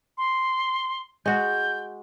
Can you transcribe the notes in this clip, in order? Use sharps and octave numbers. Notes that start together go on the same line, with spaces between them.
C6
G#3 F#4 G6